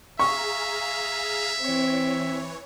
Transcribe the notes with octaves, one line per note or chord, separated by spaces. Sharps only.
G#4 E5 F5 A#5 C#6
E3 C4 C#5